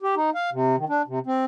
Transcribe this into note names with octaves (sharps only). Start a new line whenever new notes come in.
G4
D#4
F5
C3
D#3
D4
C3
C4